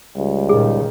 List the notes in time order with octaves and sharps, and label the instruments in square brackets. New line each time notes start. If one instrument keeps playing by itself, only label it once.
[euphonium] C#2 [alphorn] G3
[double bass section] A#2 D#3 [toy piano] G#4